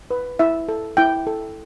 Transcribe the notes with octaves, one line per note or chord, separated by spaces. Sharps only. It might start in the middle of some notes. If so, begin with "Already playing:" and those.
B4
E4 E5
A4
E4 G5
A4